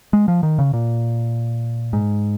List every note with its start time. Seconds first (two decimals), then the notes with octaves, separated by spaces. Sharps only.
0.13 G#3
0.28 F3
0.43 D#3
0.59 C#3
0.73 A#2
1.93 G#2